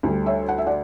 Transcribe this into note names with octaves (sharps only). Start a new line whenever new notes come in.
D2 D3 G3
C#5 E5
F#5
E5
D5 F#5